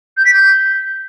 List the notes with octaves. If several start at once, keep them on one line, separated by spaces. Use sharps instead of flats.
G6
B6
G6